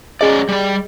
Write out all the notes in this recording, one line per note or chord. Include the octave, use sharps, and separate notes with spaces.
F#3 C#4 G#4 D5 D#5
G3 D5